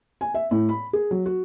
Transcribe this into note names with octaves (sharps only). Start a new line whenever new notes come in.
G#5
E5
A2
B5
G#4
F#3
F#4